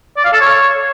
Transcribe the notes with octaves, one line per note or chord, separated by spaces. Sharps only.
D5
F5
A4
C#5